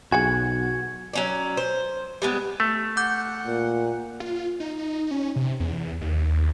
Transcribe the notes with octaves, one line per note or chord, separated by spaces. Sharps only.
B1 F#4 G#4 F#5 G#5 G#6
F#3 C#4 D5
C5
G3 G#3 B3
A3
F#5 D6 G6
A#2
F4
D#4
C#4
C3
E2
D#2